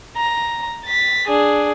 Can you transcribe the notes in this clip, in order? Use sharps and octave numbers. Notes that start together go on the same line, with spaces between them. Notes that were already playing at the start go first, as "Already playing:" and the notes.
A#5
A6 B6
D4 G#4